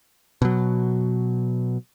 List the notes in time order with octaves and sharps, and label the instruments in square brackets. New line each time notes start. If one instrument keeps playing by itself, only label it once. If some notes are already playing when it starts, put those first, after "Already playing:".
[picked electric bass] B2 F#3